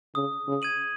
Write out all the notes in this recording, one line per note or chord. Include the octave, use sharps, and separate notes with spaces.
C#3 D#6
C#3
G#6 D#7 F#7